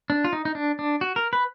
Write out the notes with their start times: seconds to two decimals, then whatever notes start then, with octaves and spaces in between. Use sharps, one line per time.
0.10 D4
0.24 F4
0.33 D#4
0.45 D#4
0.55 D4
0.79 D4
1.01 F#4
1.16 A#4
1.33 B4